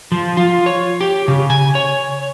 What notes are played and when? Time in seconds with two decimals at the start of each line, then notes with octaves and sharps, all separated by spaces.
0.12 F3
0.37 F4
0.66 C#5
1.01 G4
1.28 C#3
1.50 G#5
1.75 C#5